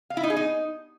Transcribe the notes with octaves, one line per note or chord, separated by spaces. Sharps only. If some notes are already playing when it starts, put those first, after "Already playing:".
F5
E4
D#4
G#4
D#4